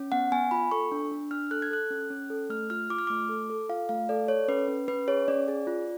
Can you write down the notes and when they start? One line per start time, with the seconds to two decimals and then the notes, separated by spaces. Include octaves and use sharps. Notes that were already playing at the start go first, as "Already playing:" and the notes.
Already playing: C#4
0.12 B3 F#5
0.32 B3 G#5
0.51 F4 B5
0.71 A4 C#6
0.92 D4
1.11 D4
1.31 D4 F6
1.51 A4 F#6
1.62 G#6
1.71 A4 F#6
1.91 C#4
2.10 C#4
2.30 A4
2.49 A3 F6
2.70 F4 F6
2.90 F4 D6
2.98 F6
3.07 A3 D6
3.29 A4
3.50 A4
3.69 F4 F5
3.89 A3 F5
4.09 A4 D5
4.28 A4 C#5
4.48 C#4 B4
4.68 C#4
4.88 C#4 B4
5.08 G#4 C#5
5.28 C#4 D5
5.48 G#4
5.67 F4